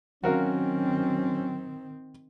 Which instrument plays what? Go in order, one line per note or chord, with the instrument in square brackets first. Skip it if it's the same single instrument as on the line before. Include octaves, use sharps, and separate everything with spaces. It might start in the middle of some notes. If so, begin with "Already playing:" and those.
[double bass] D#3 C4 [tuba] F#3 [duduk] C#4 [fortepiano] F#4 A#4 F5